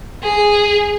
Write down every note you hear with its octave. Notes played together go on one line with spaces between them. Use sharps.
G#4